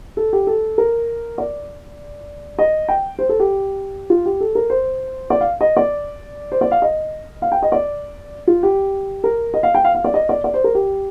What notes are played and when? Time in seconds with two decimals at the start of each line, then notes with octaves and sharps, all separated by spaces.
0.17 A4
0.33 G4
0.47 A4
0.78 A#4
1.38 D5
2.59 D#5
2.88 G5
3.19 C5
3.29 A4
3.40 G4
4.10 F4
4.26 G4
4.40 A4
4.55 A#4
4.70 C5
5.30 D5
5.41 F5
5.61 D#5
5.77 D5
6.52 C5
6.61 D5
6.71 F5
6.82 D#5
7.42 F5
7.52 G5
7.62 D#5
7.72 D5
8.47 F4
8.63 G4
9.24 A#4
9.54 D#5
9.63 F5
9.74 G5
9.84 F5
9.95 F5
10.04 D5
10.14 D#5
10.29 D5
10.44 D5
10.54 C5
10.64 A#4
10.75 G4